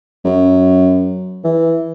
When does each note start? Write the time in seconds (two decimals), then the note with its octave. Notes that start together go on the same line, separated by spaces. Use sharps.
0.25 F#2
1.44 E3